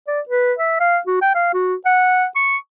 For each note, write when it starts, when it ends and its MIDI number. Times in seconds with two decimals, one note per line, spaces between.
0.07 0.21 74
0.29 0.53 71
0.58 0.80 76
0.80 0.98 77
1.07 1.19 66
1.21 1.31 79
1.35 1.50 77
1.53 1.75 66
1.85 2.26 78
2.36 2.57 85